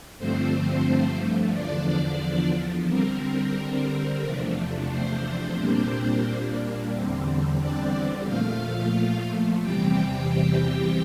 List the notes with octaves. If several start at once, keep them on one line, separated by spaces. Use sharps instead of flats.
G2 D3 F3 A3 C4 C5
E2 D3 F3 D4 D5
D3 G3 C4 A#4
E2 C3 F3 A3 D4
C4 C5
A#2 G3 A#3 D4
E2 D3 G3 C4
D4 D5
A#2 F3 A3 F4 F5
E2 C3 E3 G3 C4 G4 G5